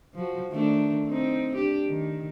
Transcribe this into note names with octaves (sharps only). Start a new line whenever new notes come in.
F3 F#4
D#3 A3 D4
C4 D#4
D4 G4
D#3